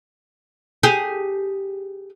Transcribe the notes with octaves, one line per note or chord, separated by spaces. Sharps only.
G4 G#4